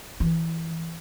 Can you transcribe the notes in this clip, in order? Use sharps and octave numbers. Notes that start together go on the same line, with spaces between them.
E3